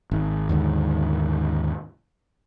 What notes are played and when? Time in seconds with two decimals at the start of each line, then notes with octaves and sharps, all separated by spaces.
0.11 G#1
0.49 D#2 G#2 D3